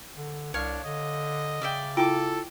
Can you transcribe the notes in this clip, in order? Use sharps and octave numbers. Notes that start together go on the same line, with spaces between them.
D3
C2 D4 C#5 F5 C#6
D3 D#5
C#3 D5 E5 G5
E4 F4 A4 G5 D6